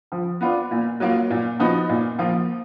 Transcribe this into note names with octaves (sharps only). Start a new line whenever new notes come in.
F3
B3 D4 F4
A#2
F#3 A#3 F4
A#2
F3 B3 D#4 F#4
A#2
F3 A#3 F4